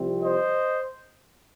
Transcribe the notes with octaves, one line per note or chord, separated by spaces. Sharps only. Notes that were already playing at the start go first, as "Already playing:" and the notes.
Already playing: C2 C3 F3 C4
C5 D#5